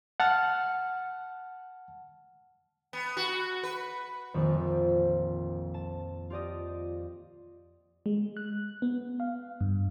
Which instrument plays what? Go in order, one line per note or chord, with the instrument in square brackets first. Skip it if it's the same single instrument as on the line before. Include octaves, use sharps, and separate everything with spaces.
[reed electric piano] F#5 A5 F6
[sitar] B3
F#4
B4
[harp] A#1 F2 D#3 F3
A5
F4 G4 D5 D#5
[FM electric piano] G#3
F#6
B3
F5
G2